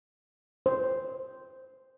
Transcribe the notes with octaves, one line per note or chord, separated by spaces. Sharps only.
C5